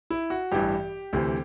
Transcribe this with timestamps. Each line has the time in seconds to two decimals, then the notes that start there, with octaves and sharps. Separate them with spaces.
0.10 E4
0.30 F#4
0.51 A1 G2 E3 G4
1.13 D2 C3 E3